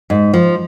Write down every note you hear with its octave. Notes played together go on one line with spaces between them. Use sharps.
G#2
F3